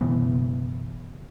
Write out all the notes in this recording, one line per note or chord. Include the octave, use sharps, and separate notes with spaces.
F#1 B2 E3 B3